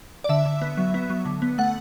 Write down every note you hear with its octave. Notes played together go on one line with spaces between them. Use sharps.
D5
D3 E5
D3
B3
F#3
B3
F#3
D3
B3
A3 F#5